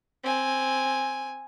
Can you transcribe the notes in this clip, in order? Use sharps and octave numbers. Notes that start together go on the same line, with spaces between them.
C4 G#5